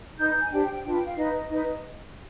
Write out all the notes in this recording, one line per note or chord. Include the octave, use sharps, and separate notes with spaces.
D#4 B4 G6
G6
G#5
D4 G4 C5 G5
G5
G5
D4 F4 B4 G5
G5
F5
D#4 B4 D#5
D#4 B4